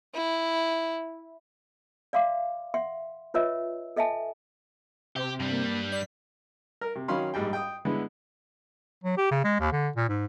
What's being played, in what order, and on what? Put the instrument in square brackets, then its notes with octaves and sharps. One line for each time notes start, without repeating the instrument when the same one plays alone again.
[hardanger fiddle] E4
[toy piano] D5 E5 F5 C6 D6
E5 F#5 C6
F4 B4 C#5 D#5 E5 E6
A4 D#5 E5 G#5 A5
[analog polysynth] C3 [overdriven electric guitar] G4
[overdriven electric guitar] G2 G3
[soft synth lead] A#3
[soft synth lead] D5 [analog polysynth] B6 C7
[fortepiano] A#4
C3
D#3 F#3 C#4 F5 B5 C6
A#1 G#2 G3 G5
G5 D#6
D3 G#3 B3 E4
[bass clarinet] F#3
G4
C#3
G#3
D#2
D3
A#2
G#2